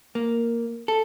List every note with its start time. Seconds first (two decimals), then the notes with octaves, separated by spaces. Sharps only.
0.15 A#3
0.88 A4